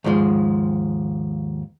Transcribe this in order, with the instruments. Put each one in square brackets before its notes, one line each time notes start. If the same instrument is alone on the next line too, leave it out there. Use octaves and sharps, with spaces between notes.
[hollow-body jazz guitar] D#2 G#2 F3 G#3